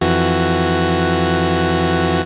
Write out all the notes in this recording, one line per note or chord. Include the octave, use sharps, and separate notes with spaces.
F2 E3 F#4